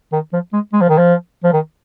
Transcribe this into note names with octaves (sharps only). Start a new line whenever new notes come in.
D#3
F3
G#3
G#3
F3
D#3
F3
F3
D#3